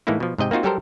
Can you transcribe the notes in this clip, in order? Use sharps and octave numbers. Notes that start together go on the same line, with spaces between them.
A2 E3 G#3 A#3 D#4 E4
B2 F3
G#2 C3 D#5 G5
A#3 C4 D#4 F4 F#4
F#3 G3 G4 A4 A#4 C5